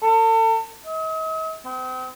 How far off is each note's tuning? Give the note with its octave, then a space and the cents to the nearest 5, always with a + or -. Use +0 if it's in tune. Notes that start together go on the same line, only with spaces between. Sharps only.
A4 +35
D#5 +45
C4 -40